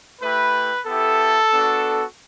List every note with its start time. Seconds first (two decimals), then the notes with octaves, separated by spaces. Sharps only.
0.21 A3 E4 G4 B4
0.86 B3 E4 G4 A4
1.52 B3 D4 F#4